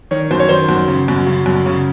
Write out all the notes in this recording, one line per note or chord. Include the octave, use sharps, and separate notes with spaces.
D#3 C#5
F#2 C5
C#5
D#3 C5
F#2
C#3
F#2
C#3
F#2
C#3